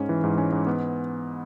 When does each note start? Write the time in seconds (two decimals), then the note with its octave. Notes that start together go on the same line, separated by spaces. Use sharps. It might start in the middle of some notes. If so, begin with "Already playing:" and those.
Already playing: G#2 C#4
0.09 E3
0.24 G#2
0.38 C#4
0.52 G#2
0.67 B3